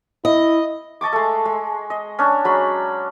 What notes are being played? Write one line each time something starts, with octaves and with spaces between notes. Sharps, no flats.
E4 D#5
D#5 A5 C#6 D6
G#3 A3
G#3
D#5
C#4 D4
F#3 G#3 B5